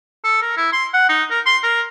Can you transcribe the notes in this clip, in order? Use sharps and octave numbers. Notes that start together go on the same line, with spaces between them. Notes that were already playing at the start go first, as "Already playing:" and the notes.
A4
A#4
E4
C6
F#5
D#4
A#4
C6
A#4